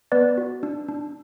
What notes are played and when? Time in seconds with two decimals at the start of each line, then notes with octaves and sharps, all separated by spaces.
0.12 B3 B4 D5
0.38 F#4
0.63 D4
0.88 D4